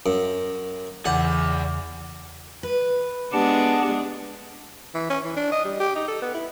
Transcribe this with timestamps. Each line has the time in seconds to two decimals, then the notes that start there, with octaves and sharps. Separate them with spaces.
0.06 F#2
1.05 E2 C#3 E3 G#4 D5 F#5
2.63 B4
3.32 G#3 B3 D4 G4 F#5 A5
4.94 E3
5.10 C#4
5.24 E3
5.36 D4
5.52 D#5
5.65 G3
5.80 G4
5.95 D#4
6.08 A4
6.22 B3
6.34 E4